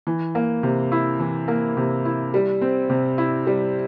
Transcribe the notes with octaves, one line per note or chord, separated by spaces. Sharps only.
E3
A#3
C3
E4
E3
A#3
C3
E4
G3
C4
C3
E4
G3